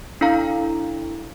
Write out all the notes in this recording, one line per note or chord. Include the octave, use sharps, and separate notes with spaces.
D4 E4 A4 F5 A#5